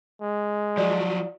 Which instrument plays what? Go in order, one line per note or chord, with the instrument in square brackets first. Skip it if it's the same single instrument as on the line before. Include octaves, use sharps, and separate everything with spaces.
[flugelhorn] G#3
[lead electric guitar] F3 F#3 [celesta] D5